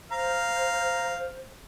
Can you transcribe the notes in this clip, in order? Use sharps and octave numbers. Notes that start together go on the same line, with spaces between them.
C5 F5 A#5